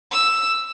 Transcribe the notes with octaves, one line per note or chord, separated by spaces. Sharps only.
E6